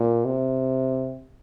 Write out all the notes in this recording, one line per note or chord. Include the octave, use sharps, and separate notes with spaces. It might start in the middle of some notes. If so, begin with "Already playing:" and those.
Already playing: A#2
C3